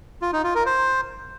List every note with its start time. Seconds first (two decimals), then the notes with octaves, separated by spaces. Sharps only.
0.22 F4
0.33 D#4
0.44 F4
0.55 A#4
0.66 C5